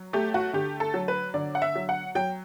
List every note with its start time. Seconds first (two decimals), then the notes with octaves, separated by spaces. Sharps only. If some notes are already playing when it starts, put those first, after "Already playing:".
Already playing: F#3
0.13 A3 G4
0.34 F#4
0.53 D3 G4
0.80 A4
0.94 F#3
1.08 B4
1.34 D3 D5
1.55 F#5
1.62 E5
1.75 F#3
1.89 F#5
2.15 F#3 G5